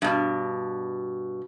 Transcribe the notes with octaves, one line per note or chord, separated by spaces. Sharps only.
G2 B2